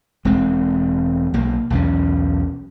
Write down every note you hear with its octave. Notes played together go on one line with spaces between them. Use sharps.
E1 G#3 C4
B1 A#3
B1 E2 G3 C#4